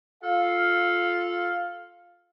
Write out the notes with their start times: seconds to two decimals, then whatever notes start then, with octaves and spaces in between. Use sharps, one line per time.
0.23 F4 A4 F5